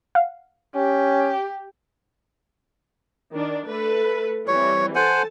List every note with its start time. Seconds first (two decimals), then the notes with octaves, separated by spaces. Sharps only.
0.15 F5 F#5
0.76 C#4 G4
3.32 D#3 D4
3.66 A3 A4 B4
4.48 E3 G3 C4 C#5
4.95 A4 C5 F#5 G#5 A5